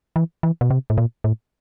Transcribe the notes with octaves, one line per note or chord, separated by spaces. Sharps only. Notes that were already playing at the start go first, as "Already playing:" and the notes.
E3
E3
B2
C3
A2
A#2
A2